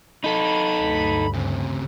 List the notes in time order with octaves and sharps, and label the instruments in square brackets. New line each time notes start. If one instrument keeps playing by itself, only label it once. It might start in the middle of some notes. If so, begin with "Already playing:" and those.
[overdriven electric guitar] D#4 A4 [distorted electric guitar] B5
[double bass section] D2 G2
[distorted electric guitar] C#3 C4